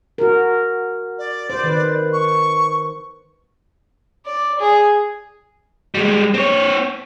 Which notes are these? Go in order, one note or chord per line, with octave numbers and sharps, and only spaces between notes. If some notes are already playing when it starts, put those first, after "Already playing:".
F#4 A#4
D5
C5
D#3 B4
C#6
D5
G#4
G3 G#3
C4 C#5